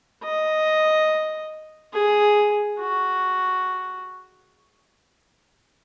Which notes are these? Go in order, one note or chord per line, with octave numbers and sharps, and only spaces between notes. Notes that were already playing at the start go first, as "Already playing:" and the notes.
D#5
G#4
F#4